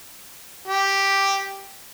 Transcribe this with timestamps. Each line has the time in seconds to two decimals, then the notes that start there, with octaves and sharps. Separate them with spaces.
0.68 G4